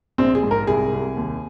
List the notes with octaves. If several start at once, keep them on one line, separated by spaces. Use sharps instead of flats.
A#1 C4
G#4
G#2
A#4
C2 G#4
C2
D#2